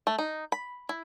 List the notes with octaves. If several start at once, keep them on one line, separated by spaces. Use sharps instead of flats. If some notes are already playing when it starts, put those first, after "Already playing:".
A3
D#4
B5
E4